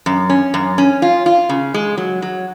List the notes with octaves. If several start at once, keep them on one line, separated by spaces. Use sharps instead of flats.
F#2
C#4
F#2
C#4
F4
F4
C#3
G#3
F#3
F#3